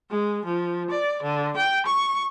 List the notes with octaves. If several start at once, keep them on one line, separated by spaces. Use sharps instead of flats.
G#3
F3
D5
D3
G5
C#6